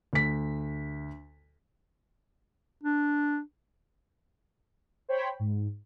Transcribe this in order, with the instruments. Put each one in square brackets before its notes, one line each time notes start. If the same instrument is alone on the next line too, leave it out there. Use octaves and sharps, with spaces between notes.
[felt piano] D2 B6
[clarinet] D4
[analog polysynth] C5 C#5 G5 B5
G#2